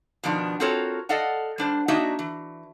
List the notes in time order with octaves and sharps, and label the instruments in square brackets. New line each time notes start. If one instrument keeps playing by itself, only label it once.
[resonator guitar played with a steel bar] B2 D#3 F3 D4
C4 F4 F#4 A4 A#4 C#5
A4 D5 D#5 F5 F#5
G3 D4 C5
A#3 D4 D#4 F#4 D#5 E5
E3